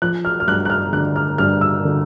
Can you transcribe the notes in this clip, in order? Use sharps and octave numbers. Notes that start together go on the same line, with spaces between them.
F3 F#6
F6
F6
G2 F#6
F#6
F6
D3 F#6
F6
G2 F6
E6
D3